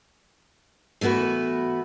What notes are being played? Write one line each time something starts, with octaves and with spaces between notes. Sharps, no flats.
E3 A3 B3 F#4 B4